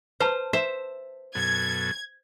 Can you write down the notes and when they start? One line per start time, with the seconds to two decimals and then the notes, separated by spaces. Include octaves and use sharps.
0.20 B4 C5 A5
0.53 C5 E5
1.35 F#2 B2 A4 G#6